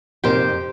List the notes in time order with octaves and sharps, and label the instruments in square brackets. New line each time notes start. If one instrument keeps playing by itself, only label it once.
[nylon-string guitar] F2 C3 F3 D#4 A#4 [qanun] G4 C5